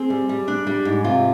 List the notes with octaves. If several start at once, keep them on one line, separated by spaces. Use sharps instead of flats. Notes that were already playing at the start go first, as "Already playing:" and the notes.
Already playing: C4 G#4
G3
G3
D4
G3
G#2
C3 F4